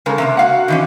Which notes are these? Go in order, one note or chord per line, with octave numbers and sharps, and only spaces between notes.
C#3 G#3 A4 A#4
C3 G#3 A#3
F#4 F5 F#5
D#3 E3 C#4